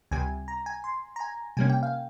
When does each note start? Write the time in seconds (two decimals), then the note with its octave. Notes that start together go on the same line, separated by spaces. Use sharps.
0.11 C#2 C3 G3 G#5
0.48 A#5
0.66 G#5
0.84 C6
1.16 A#5
1.20 G#5
1.57 C3 G3 A#3 C#4 G#5
1.70 G5
1.83 F5